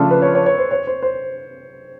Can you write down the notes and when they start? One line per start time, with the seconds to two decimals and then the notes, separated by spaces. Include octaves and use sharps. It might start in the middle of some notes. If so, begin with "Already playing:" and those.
Already playing: C#3 F3 A3 D4 F4 A4
0.11 B4
0.22 C#5
0.35 C#5
0.46 C#5
0.58 C5
0.71 C#5
0.87 C5
1.03 C5